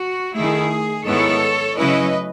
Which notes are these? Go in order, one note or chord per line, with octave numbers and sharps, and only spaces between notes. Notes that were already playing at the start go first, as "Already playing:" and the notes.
Already playing: F#4
D#3 A3 E4 G#4
G#2 D#3 G#3 B3 E4 A4 C#5
C#3 F#3 A3 C#4 E4 B4 D#5